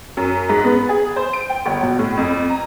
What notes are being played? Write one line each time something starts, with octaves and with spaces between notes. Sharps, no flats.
F#2
G#2
B3
G#4
C5
D7
G5
G1
B2
A2
F2
A#5